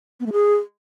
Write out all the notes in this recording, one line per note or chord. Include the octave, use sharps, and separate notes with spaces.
B3
A3
G#4